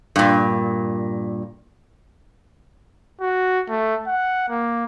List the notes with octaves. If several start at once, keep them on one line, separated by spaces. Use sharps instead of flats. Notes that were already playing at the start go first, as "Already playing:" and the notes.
G2 A#2
F#4
A3
F#5
A#3